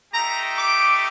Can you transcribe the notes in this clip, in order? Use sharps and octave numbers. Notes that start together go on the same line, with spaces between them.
A3 D#4 G4 A#5
D6